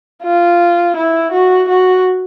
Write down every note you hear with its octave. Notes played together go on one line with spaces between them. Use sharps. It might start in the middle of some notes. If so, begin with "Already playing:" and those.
F4
E4
F#4
F#4